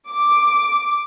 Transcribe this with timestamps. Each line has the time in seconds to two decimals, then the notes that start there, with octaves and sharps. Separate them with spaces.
0.12 D6